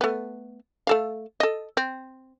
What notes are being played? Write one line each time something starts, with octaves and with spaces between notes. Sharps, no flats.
A3 B3
A3 A4 F5
A4 D#5
C4